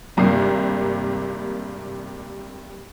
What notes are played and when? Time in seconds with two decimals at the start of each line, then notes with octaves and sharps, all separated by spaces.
0.17 G#1 G2 C3 A#3 C7